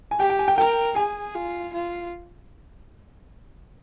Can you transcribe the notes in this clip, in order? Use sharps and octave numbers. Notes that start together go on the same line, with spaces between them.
G#5
G4 G5
G5
G#5
G5
A#4 G5
G#4 G#5
F4
F4